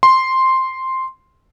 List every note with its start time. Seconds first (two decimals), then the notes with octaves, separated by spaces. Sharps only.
0.03 C6